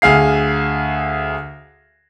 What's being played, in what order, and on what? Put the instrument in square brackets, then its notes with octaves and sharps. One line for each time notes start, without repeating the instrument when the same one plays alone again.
[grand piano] D2 G#4 F5 C7